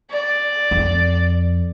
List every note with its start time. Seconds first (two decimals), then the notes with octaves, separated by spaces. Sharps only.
0.10 D5
0.71 F2